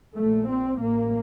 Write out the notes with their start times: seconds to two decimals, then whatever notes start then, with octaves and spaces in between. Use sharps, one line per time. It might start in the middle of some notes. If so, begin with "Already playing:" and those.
0.16 A#1 A#2 A3
0.48 C4
0.81 A1 A2 A#3